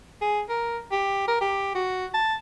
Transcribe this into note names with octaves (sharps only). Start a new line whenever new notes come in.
G#4
A#4
G4
A#4
G4
F#4
A5